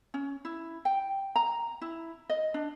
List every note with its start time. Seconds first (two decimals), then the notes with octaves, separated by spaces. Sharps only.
0.14 C#4
0.45 E4
0.85 G5
1.36 A#5
1.81 E4
2.30 D#5
2.54 D4